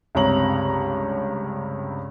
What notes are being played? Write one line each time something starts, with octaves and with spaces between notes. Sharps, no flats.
C#2 G2 C3 C#5 A#5 F#7